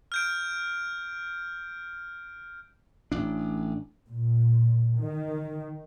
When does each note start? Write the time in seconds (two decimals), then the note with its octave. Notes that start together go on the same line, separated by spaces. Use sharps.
0.12 F6 G6 D7
3.12 A1 D4
4.09 A#2
4.97 D#3